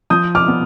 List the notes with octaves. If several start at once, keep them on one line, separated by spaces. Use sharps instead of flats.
F3 D#6 G6
D6 F6
B3